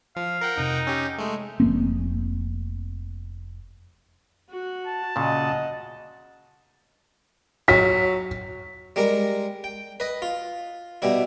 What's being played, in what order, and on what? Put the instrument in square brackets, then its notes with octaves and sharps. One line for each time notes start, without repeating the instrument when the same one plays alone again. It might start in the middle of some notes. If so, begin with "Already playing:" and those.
[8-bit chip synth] F3 [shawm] F5
[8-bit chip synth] A#4 F#5 G5
[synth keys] F2 C3 [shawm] D#4
[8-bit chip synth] C#4 G4 [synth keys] E6
[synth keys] G6
[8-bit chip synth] G#3 A3
[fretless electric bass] F1 A#3 C4
[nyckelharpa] F#4 F#5
[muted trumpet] A5
[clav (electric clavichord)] A#2 C#3 [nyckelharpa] D#5 F#5
[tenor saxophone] F#3 [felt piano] B6
[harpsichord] G3 G#3 A#4
G5
B4 D#5
F4
B2 G3 E4